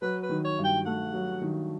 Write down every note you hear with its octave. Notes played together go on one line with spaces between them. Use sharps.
F#3 B4
B4
D#3
C#5
G2
G5
A3 F#5
F#3
D#3